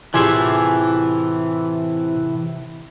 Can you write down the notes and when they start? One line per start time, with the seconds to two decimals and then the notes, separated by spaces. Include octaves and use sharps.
0.14 A2 C3 E3 F4 G4 G#4 E5 G#5